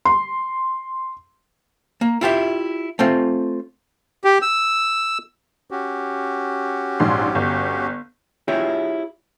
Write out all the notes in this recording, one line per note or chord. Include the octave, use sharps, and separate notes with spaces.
C6
A#3
E4 F4 G4 E5
A3 C4 F4
G4
E6
C#4 F#4 G4
A#1 G#2 C6
G1
E4 F4 G4 G#4 C#5 E5